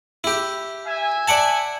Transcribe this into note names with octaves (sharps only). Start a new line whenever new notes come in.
E4 G4
E5 G#5
D5 F#5 A5